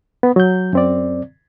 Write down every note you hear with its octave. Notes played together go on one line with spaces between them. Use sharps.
B3
F#3 G6
F#2 C4 D5